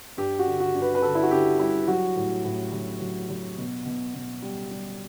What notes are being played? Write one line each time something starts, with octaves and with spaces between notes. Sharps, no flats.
G2 G4
F#4
D3
F#4
G2
B4
B4
D3 A4
E4
F#4
D3 G4
G3 E4
F#3 F#4
A2
A2
F#3
F#3
F#3
B2
B2
B2
G3
G3